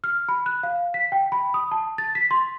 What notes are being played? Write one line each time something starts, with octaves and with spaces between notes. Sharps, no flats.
F6
B5
F#6
F5
B6
G5
B5
D#6
A5
A6
B6
C6